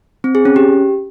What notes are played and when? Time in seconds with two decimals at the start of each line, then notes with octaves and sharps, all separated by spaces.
0.24 C4
0.35 G#4
0.45 C#4
0.56 G4